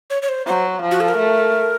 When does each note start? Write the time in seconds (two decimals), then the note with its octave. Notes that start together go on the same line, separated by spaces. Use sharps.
0.10 C#5
0.22 C#5
0.29 C5
0.47 F#3 C5
0.82 F3
0.91 F#4
1.00 A4
1.08 A#4
1.18 A3